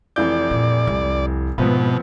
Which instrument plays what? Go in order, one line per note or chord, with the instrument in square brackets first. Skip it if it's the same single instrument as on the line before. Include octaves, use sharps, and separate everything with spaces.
[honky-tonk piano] F1 E3 G6 [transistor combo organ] D5
[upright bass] A#2
C2
[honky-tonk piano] C2 F3 B3 [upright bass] G#2 [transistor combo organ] B2